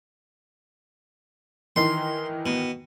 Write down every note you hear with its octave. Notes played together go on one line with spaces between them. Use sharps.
D#3 E3 D#4 C6
B2